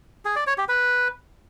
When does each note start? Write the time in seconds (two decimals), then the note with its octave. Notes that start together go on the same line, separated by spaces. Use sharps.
0.25 G#4
0.36 D5
0.47 C#5
0.58 G4
0.68 B4